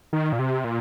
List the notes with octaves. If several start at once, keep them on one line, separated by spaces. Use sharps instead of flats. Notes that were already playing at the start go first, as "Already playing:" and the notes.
D#3
A#2
C3
A#2